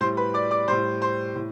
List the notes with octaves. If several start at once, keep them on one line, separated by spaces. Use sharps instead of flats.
A2 G3 C5 C6
B4 B5
D5 D6
D5 D6
A2 G3 C5 C6
C5 C6
A2